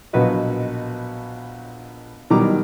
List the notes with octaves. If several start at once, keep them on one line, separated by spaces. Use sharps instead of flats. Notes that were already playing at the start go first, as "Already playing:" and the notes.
A#1 B2 F#3 F#4 B4 D#5
B2 D#3 F#3 G3 A#5 D6